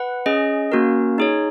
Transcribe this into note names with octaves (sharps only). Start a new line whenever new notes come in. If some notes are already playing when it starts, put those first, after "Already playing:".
Already playing: B4 F#5
C#4 G#4 D#5
A#3 C#4 F#4 A#4
D#4 G#4 C#5